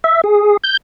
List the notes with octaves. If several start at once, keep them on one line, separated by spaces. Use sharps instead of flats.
E5
G#4
G6